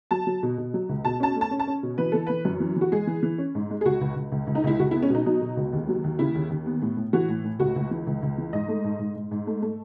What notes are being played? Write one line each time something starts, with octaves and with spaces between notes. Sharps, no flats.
F#3 A5
F#3
B2
B2
F#3
C#2
B2 A5
C#4 A5
A3
A5
C#4
A5
C#4
B2
E3 B4
E3 A4
E3 B4
F#2
E3
E3 F#4
G#3 G#4
E3
E3
C#4
G#2
G#3
G#4
C#2 F#4
C#2
C#2
C#2
C#2
D#4
C#2 E4
C#2 F#4
E4
B3
C#4
B2 D#4
F#3 D#4
B2
C#2
D#2
F#3
D#2
C#3 E4
D#2
D#2
B3
A2
A2
E3 F#4
A2
A2
C#2 F#4
C#2
E3
C#2
C#2
E3
G#2 D#5
A3
G#2
G#2
G#2
G#2
A3
A3